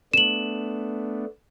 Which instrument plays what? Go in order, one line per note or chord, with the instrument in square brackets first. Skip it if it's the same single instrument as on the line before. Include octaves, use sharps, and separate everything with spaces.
[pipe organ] A3 B3 D4 [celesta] E7 F#7